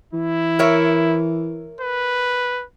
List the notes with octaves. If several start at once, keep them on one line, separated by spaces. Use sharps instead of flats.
E3 E4
A#4 C#5 E5
B4